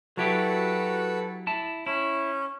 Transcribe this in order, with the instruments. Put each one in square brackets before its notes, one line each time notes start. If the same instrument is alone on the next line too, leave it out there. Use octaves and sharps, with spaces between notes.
[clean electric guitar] F#3 E4 G4 [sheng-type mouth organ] F#4 A4 B4
[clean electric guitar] E4 A5
[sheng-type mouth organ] C#4 [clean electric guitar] E4